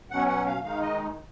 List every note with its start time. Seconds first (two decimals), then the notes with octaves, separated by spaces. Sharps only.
0.11 B2 F#3 C#4 F#5
0.28 F#5
0.47 F5
0.63 D#3 G#3 D#4 F5
0.81 D#5